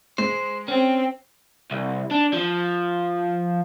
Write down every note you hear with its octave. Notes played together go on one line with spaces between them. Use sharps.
G#3 C5
C4 C#4
C2
D4
F3